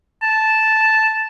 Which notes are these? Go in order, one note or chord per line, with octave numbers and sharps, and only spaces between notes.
A5